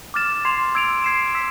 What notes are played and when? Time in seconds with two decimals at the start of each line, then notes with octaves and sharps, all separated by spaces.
0.14 D6 F6 A6 E7
0.45 C6 G#6 C7 F7
0.75 E6 G#6 D7 F7
1.04 E6 G#6 C7 E7
1.35 E6 B6 E7